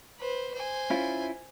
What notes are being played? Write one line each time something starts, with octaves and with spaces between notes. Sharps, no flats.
B4 C5
C5 G#5
C#4 E4 F4